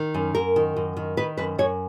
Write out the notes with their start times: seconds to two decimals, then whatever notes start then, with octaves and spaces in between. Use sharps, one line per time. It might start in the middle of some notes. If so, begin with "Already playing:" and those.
Already playing: D#3
0.14 F#2
0.35 F#2 A#4
0.56 D#3
0.76 F#2
0.97 D#3
1.17 D#3 B4
1.37 F#2 B4
1.59 F#2 C#5